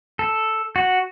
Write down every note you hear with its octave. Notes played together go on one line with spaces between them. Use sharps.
A4
F#4